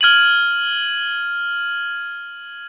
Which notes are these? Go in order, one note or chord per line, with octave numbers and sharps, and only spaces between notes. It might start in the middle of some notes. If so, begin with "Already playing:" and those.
F6 G#6 D#7 F#7